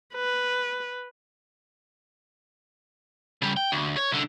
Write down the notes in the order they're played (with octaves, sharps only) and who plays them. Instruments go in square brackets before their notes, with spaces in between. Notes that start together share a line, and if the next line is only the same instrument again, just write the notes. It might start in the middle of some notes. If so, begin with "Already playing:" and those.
[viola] B4
[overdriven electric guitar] C#3 G3
G5
D2
C#5
C2 D3